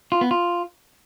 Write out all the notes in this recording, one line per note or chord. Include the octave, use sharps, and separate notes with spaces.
F4
B3
F4